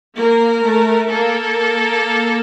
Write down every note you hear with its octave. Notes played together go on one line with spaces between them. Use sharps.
A#3 A#4
A3
A#3 A4